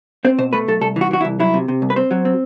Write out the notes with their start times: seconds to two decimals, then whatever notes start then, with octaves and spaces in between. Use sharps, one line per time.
0.25 C4 C5
0.38 B2 C5
0.53 A3 B4
0.68 B1 A4
0.81 C2 A4
0.96 E3 F#4
1.11 E3 F#4
1.21 E4
1.25 C2
1.40 F#3 E4
1.54 C3
1.68 C3
1.82 C2
1.90 B4
1.96 C4 C5
2.11 F#3
2.25 C4